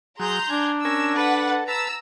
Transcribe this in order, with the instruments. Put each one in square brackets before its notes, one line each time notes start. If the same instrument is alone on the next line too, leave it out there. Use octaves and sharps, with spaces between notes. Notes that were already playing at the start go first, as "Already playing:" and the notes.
[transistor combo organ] F#3 [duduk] G#4 [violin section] A#5 C6 G6
[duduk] D4 [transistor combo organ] G#5
[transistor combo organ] C#4 A#4 G#5 [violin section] E6
[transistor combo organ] A4 [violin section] B4 F#5
[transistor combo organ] B4 A5 [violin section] A#5 E6